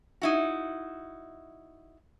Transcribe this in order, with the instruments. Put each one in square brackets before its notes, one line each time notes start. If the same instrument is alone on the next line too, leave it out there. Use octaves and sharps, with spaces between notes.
[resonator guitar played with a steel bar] D#4 E4 F#4